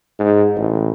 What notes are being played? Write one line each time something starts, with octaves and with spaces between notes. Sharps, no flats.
G#2
A1